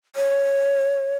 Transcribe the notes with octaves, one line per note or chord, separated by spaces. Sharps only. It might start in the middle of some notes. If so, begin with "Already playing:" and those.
C#5